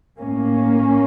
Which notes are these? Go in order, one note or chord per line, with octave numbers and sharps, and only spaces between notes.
A2 A#3 C#4